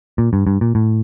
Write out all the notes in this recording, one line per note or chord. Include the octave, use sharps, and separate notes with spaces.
A#2
G2
G2
A#2
A2